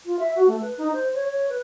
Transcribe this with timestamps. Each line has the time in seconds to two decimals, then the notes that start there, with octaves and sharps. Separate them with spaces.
0.05 F4
0.19 E5
0.35 F#4
0.47 A3
0.61 B4
0.77 D#4
0.92 C5
1.14 C#5
1.28 C#5
1.49 B4